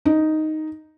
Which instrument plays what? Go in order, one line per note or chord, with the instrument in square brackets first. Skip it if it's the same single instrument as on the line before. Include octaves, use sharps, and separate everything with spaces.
[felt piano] D#4